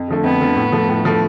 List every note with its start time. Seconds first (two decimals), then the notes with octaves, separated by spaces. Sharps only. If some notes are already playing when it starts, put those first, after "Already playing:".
Already playing: F2
0.08 D3 F3 A3
0.24 F2 B3
0.40 D3 F3 A3
0.56 A2
0.72 F3 A3
0.88 A2
1.05 F3 A3